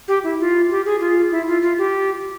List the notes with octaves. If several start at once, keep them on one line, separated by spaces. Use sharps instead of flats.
G4
E4
F4
G4
G#4
F4
E4
F4
F4
G4